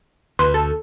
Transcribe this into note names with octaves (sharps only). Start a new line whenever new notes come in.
D2 B4 C6
A4